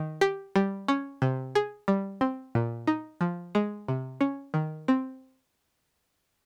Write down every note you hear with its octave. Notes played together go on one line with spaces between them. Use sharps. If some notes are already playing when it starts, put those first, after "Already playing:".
Already playing: D#3
G4
G3
C#4
C3
G#4
G3
C4
A#2
D#4
F3
G#3
C3
C#4
D#3
C4